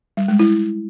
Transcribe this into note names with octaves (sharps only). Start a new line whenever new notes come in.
G3
G#3
E4